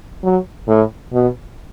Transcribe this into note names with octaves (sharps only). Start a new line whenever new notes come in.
F#3
A2
B2